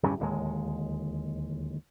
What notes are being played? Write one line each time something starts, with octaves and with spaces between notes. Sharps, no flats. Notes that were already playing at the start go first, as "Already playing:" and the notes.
D1 G2 G3 C#4
D1 D#2 G#3